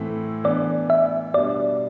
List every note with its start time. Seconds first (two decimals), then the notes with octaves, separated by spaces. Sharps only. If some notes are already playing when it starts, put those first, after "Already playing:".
Already playing: A2 E3 A3 C4 E4
0.44 E3 B3 D4 D5
0.90 E5
1.34 B2 G3 D4 D5